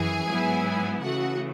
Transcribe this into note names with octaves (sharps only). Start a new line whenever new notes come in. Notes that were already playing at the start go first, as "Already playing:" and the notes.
Already playing: F#2 E3 G#4 G#5
G#2 F#3 B3 E4
C#3 E3 A3 F#4 F#5